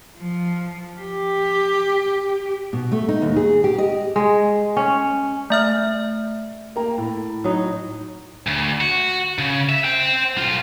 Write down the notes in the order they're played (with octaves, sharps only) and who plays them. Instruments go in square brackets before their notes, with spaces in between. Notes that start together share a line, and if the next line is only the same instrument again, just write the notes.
[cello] F3
G4
[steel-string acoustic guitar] B2
A3
D#4
D#2
G#4
G4
D#5
[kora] G#3
C#4
[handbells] A3 E5 F6
[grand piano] A#3 G5 A#5
A2
[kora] F#3 D#4
[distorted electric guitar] D2
F#4
C#3
E5
C5 G5
B1 F4